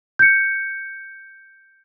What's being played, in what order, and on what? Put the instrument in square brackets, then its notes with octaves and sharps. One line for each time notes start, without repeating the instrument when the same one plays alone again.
[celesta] G6 C#7